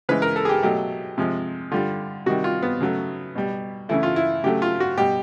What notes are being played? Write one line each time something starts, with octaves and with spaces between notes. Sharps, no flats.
C#3 E3 G#3 B4
A#4
A4
G#4
G4
B2 F#3 A3 G4
C3 F3 G#3
D3 G3 F4
C3 D#3 G3 F#4
F4
B3
C#3 F#3 A3
B2 G3
C#3 E3 A3 E4
F4
E4
C#3 F#3 A3 G4
F4
F#4
B2 G3 G4